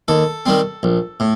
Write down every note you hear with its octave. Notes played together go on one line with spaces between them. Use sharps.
D#2 A4
D#3 G3 C4
A#1
A2